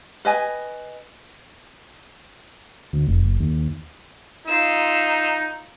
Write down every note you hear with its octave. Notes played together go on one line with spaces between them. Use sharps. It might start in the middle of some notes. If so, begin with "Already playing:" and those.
B4 D#5 G#5
D2
F1
F#1
D#2
D#4 F4 E6